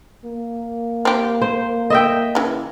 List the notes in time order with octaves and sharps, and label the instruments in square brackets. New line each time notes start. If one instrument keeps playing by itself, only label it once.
[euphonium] A#3
[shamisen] C4 G4
[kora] C5
D#5 E5 G5
[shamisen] C#3 E3